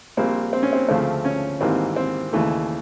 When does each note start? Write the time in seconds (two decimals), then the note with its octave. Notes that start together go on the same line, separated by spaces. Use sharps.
0.17 A#1 A#2 G3 A#3 C4
0.53 C4
0.63 C#4
0.73 C4
0.88 D2 C#3 F3 A3 C4
1.25 C#4
1.61 G#1 G#2 E3 G3 A#3 C4
1.96 C4
2.33 D#2 C#3 E3 A3